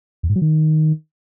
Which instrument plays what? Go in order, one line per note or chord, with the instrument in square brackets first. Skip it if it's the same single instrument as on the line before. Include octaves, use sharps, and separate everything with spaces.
[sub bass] E2
G#2
F#3
D#3